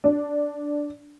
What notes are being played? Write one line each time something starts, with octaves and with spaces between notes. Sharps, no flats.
D4